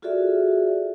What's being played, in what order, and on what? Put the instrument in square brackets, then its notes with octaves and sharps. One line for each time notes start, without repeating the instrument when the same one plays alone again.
[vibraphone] F4 F#4 G#4 A4 D5 E5